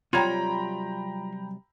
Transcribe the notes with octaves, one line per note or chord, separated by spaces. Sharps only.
C3 F#3 G3 F4 C#5 G5 A#5 B5